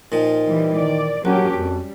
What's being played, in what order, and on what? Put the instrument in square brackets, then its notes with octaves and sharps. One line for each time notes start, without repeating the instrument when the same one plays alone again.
[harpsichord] A#2 F3 [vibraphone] D#4 D#5 G5
[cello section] E3 G3
[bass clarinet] D#3 [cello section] D5
[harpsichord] A#1 [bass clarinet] F#3 [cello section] G3 C#4 G4 [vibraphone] F#4 A5
[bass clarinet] F2 [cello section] G3